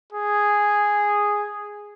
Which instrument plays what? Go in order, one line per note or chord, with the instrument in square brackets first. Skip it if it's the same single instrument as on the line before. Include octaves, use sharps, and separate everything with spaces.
[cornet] G#4